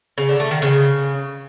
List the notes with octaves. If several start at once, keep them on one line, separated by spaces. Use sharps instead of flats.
C#3
D3
A3
D#3
C#3